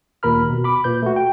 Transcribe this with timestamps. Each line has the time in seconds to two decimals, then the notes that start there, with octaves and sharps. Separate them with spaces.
0.23 D#2 A#2 A#4 B5 F6
0.50 B2
0.64 B5 D6
0.84 A#2 B4 G6
1.02 A3 F#4
1.16 G5